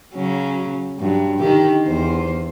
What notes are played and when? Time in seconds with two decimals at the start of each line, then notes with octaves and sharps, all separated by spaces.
0.14 C#3 F#3 C#4
0.99 G2 F#3
1.39 D3 D#3 G4
1.83 E2 C5